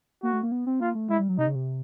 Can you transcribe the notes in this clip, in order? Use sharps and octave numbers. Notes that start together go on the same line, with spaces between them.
A#3 F#4
A3
A#3
B3
C4
A#3 F4
A3
G#3 E4
G3
F#3
C3 D#4
C#3
C3